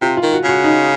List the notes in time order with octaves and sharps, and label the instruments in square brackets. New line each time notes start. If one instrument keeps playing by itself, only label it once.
[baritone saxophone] C3 [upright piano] F4
[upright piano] F4
[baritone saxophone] D#3
[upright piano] F#4
[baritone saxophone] C#3 [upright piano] F#4
[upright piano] D#4